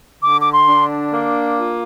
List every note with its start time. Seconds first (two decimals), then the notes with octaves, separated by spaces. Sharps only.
0.22 D3 D6
0.41 D6
0.53 C6
0.68 D4
1.11 A#3
1.57 F4